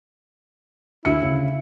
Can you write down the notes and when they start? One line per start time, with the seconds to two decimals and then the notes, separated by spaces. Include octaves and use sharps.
1.05 D2 E4 C#7
1.22 C#3